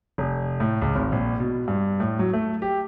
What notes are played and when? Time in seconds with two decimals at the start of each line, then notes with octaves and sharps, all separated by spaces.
0.18 F1
0.60 A2
0.82 C#2
0.95 G#1
1.12 A#1
1.40 B2
1.68 G2
2.00 A2
2.19 F#3
2.33 A3
2.62 G4